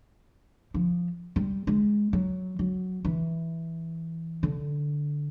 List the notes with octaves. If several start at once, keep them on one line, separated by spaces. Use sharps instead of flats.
F3
G3
G#3
F#3
F#3
E3
D3